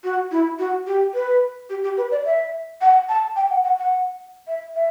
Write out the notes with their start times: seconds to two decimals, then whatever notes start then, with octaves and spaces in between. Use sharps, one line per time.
0.04 F#4
0.31 E4
0.59 F#4
0.87 G4
1.14 B4
1.70 G4
1.84 G4
1.97 B4
2.11 D5
2.25 E5
2.81 F#5
3.09 A5
3.36 G5
3.50 F#5
3.64 F#5
3.78 F#5
4.47 E5
4.75 E5